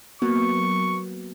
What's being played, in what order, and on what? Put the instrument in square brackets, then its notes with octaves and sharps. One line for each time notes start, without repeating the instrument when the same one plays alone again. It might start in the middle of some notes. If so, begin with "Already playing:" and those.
[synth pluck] F#3 A#3 B3 [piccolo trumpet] C#6